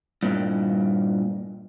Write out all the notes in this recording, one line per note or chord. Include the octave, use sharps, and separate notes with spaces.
G2 A#2